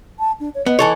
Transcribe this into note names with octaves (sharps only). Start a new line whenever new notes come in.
A5
D4
C#5
B3 D#5
E3 A4 C#5